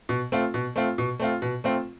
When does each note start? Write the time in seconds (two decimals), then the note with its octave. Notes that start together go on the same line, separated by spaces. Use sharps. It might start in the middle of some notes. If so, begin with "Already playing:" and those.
0.09 B2
0.32 A3 C4 F4
0.54 B2
0.76 A3 C4 F4
0.98 B2
1.19 A3 C4 F4
1.42 B2
1.64 A3 C4 F4